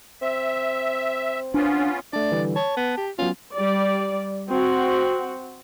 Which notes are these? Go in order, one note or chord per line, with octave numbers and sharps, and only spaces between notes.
C4 E5
B3 C#4 D4 F4
A3 D4 D5
D3 E3 G3
C#5 A5
B3
G4
F#3 B3 C#4 F4
G3 D5
C4 F#4